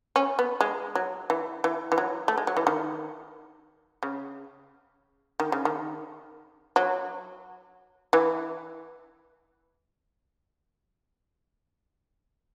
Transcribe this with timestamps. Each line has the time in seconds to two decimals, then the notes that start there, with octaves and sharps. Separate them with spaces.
0.16 C#4
0.39 B3
0.61 G#3
0.95 F#3
1.30 E3
1.64 E3
1.92 E3
1.98 F#3
2.28 A3
2.38 G#3
2.47 F#3
2.57 E3
2.67 D#3
4.03 C#3
5.40 D#3
5.52 C#3
5.65 D#3
6.76 F#3
8.13 E3